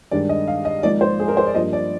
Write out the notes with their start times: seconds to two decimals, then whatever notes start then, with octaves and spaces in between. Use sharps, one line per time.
0.11 G2 D#3 G#3 D4 D5
0.29 D#5
0.48 F5
0.65 D#5
0.83 G#1 G#2 F3 A#3 D#4 D5
1.01 C5
1.20 G#4
1.28 A#4
1.37 C5
1.46 D5
1.54 G2 F3 A#3 D4 D#5
1.73 D5